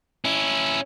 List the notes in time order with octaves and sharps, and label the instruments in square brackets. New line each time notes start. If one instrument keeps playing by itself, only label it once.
[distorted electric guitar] C#4 E4